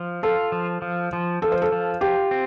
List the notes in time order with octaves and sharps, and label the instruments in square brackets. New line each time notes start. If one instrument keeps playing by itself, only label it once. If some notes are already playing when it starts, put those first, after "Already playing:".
Already playing: [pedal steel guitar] F3
[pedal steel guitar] F4 [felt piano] A4
[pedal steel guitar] F3
F3
F3
[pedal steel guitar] F3 [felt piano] A4
[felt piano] C5
A4
[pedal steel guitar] F3
[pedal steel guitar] F4 [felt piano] G4
[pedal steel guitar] C4